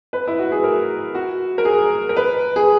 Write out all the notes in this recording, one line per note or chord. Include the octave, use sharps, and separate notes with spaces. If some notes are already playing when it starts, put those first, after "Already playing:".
B4
E4
F#4
G#4
A#4
F#4
A#4
G#4
A#4
B4
G#4